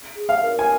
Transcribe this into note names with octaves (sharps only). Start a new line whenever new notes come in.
G#4
F5
A#4
G#5